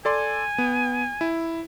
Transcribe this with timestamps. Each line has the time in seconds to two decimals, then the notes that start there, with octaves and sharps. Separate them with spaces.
0.05 A4 D5 G#5 C6
0.58 B3
1.21 E4